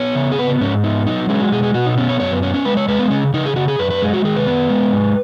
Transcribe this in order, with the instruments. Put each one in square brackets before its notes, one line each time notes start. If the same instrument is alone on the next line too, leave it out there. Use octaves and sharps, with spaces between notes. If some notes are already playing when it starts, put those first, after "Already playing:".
Already playing: [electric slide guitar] B3 C#5
C#3
G#4
B3 B4
B3
G#2 C#4
B3 D#4
F#3 D#4
G#3 C#4
F#4
B2 G#4
G#4
B2 F#4
D#4
B3 C#4
C#5
F#2 C#5
B3
B3 C#4
C#4
G#3 B4
C#5
G#3 B4
B3
C#3 C#4
C#3 D#4
G#4
C#3 F#4
G#4
F#2 B4
B4
G#3 G#4
F#4
D#3 G#4
B4
B3
G#3
G#2